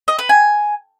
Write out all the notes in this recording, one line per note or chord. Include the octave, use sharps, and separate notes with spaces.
D#5
B4
G#5